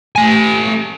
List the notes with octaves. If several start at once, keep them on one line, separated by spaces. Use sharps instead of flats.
A3 G#5